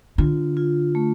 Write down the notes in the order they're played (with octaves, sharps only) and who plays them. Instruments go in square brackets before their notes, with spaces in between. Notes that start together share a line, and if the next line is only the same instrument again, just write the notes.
[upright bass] D3 [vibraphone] F4
[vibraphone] F4
A3